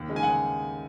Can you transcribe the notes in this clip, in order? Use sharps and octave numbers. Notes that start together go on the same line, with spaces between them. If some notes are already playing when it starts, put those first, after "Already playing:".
Already playing: D#2
C#3 G#3 D#4
G#5
D#2 F#5